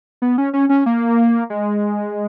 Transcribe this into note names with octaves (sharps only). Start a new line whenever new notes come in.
B3
C#4
C#4
C#4
A#3
G#3